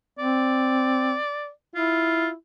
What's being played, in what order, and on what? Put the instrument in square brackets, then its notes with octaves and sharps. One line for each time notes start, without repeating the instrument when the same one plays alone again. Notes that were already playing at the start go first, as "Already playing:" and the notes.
[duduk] C4 [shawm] D5
[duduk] E4 [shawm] F4